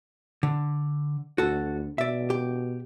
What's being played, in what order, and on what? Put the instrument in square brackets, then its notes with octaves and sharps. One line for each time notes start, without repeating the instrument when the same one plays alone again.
[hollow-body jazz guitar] D3
[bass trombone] D2 [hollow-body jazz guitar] F#4 A4
[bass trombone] B2 [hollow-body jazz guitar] D5 E5
[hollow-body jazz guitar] G4